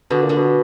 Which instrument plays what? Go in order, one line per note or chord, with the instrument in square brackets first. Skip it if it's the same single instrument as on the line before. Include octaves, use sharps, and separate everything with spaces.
[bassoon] B2 [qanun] D3 D4
[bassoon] A#2
[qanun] D3 D4
[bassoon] B2